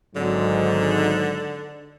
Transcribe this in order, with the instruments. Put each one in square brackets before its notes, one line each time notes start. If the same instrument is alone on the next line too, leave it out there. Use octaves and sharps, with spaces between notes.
[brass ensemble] G#1 G#2 F#3 [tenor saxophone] D3